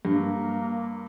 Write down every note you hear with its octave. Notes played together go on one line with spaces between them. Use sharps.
G2 A#3